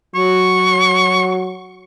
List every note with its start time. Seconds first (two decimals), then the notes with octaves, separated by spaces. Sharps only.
0.15 F#3 C#6